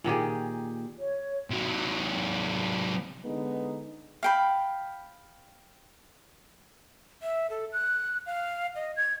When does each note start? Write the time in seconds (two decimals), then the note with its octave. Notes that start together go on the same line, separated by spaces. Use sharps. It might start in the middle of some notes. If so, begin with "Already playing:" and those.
0.04 A#2 D#3 G4 G#4
0.97 C#5
1.50 C3 F#3
3.25 D3 G#3 B3 D#4
4.23 F5 G5 B5
7.23 E5
7.50 A4
7.73 F#6
8.26 F5
8.75 D#5
8.97 G#6